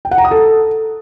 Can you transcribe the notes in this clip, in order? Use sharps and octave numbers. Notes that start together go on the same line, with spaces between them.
G5
F#5
A#5
D#6
A4